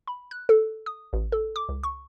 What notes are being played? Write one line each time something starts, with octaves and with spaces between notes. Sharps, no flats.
B5
F#6
A4
D#6
A1
A4
D6
C#2
C#6